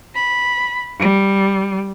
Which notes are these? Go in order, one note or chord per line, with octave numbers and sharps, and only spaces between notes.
B5
G3